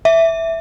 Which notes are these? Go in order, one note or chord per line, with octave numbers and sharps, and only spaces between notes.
E5